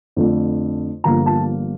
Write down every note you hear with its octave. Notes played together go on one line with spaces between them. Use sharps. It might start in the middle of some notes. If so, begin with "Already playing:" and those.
F2 D3 A3 D4
G1 G2 D3 F3 A#3 A#5
A5